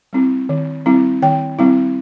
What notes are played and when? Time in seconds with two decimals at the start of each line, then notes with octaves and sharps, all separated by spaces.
0.13 G3 C4 E4
0.49 D#3
0.86 G3 C4 E4
1.22 D#3 G5
1.59 G3 C4 E4